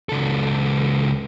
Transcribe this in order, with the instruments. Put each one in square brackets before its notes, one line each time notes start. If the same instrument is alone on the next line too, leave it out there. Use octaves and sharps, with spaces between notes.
[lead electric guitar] C#2 A4